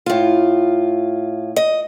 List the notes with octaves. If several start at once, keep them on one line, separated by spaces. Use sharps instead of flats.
A2 F4
D#5